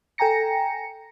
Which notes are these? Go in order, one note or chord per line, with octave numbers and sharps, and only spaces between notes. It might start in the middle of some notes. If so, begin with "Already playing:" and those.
A4 G5 G#5 A#5 A#6 C#7